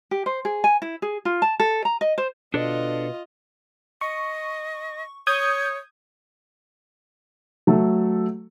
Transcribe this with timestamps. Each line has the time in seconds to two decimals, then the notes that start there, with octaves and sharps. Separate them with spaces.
0.11 G4
0.26 C5
0.45 G#4
0.64 G#5
0.82 E4
1.02 G#4
1.25 F4
1.42 A5
1.60 A4
1.85 A#5
2.01 D#5
2.18 C5
2.54 B2 D4 F4 A4 D5 D#5
4.01 D#5 C#6
5.27 C#5 D#6 G6 G#6
7.67 F#3 A3 A4